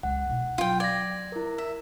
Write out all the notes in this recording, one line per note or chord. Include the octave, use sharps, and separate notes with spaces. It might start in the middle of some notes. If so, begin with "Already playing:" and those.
C#2 F#5
B2 D#4
F#3 F4 G5
D5 G#6 A#6
E4 A#4
E5